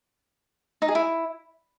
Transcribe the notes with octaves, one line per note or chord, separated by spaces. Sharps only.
D#4
G#4
E4